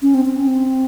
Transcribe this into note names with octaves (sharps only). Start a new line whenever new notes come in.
C#4
C4
C4
C#4
C4